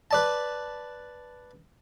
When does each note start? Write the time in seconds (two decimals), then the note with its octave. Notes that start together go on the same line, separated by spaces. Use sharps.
0.11 B4 D5 A5